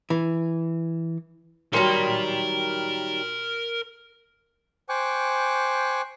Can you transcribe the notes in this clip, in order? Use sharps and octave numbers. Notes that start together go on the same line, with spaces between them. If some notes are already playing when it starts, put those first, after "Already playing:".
E3
D#3 F#3 G3 A#4 C6
C5 G5 G#5 C#6 D6 F#6